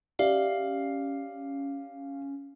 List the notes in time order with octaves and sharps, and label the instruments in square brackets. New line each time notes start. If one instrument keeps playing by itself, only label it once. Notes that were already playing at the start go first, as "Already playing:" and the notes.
[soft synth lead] C#4 [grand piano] G4 [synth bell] D5 E5 [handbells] F5